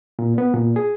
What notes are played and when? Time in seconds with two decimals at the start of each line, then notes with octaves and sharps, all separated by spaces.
0.19 A#2
0.38 B3
0.54 A#2
0.76 G#4